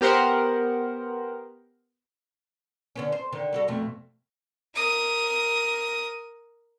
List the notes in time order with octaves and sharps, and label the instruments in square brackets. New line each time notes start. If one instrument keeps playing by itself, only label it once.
[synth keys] B3 G4 A#4 C5 F#5
[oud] D3 B3 C#4
C5
D3 D#3
G3 F#4 A4
F2 B2 A3
[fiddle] A#4 D#6